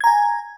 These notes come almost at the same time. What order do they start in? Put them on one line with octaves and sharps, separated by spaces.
G#6 A#5 G#5